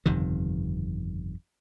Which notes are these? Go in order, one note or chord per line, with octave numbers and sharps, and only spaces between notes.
G1 F2 C3 D#3